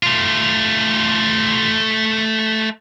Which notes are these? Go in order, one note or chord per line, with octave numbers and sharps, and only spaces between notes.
A3 F4